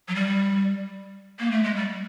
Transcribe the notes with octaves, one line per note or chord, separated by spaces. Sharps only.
F#3
G3
A#3
A3
G#3
G3